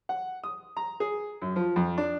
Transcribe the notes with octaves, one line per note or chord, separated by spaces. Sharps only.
F#5
D#6
A#5
G#4
F#2
F3
F2
D4